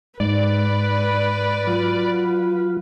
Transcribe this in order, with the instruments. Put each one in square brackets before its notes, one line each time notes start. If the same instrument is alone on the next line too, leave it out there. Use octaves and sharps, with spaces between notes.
[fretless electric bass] G#2 [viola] B4 [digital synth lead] D5
[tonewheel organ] F#3 F4